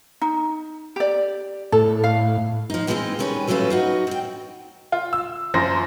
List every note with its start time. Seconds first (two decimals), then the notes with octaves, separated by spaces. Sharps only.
0.21 D#4
0.96 G4 D5
1.72 A2 A4
2.04 F5
2.70 F3 D#4
2.87 E3 G#3 C4 D4 D#4 F4
3.19 D#3 G3 C#4 A4 B4
3.48 E3 F#3 A3 C#4 F4 B4
3.70 F3 D#4 F#4
4.07 C4 G5
4.92 F4
5.13 E6
5.54 F#2 F3 C5 C6 A#6